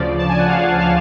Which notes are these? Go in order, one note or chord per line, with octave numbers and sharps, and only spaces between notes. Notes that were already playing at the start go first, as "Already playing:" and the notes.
Already playing: D2 C#3 F3 D5
A5
G#5
F#5
F5
F#5
F5